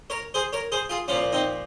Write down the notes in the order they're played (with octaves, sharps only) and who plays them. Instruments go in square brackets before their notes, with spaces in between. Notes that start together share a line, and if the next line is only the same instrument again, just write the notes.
[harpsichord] A#4 C#5
G#4 C5
A#4 C#5
G#4 C5
F4 G#4
A#2 F3 C#4 F4
C4 D#4